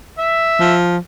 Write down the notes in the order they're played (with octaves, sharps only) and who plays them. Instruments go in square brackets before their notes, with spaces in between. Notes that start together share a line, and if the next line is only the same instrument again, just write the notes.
[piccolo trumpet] E5
[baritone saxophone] F3